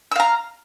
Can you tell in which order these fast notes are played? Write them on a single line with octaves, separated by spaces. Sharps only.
E6 F5 A#5